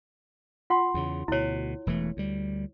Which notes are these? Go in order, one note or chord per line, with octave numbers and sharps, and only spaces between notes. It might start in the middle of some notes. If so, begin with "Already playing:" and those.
F4 F#5 C6
E2 C#3
D2 B2 E4 C#5
E1 E3 A3
D2 G3